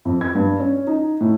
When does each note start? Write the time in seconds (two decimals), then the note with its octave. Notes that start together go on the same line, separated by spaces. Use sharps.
0.05 F2
0.21 G#6
0.35 G2
0.60 C#4
0.87 D#4
1.21 A2